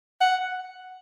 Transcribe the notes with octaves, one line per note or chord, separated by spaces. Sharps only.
F#5